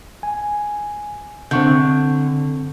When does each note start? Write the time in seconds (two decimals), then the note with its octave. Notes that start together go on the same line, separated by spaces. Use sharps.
0.23 G#5
1.51 D3 C4 C#6 G6